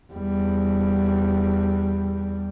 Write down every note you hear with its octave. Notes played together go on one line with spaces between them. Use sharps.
E2 G3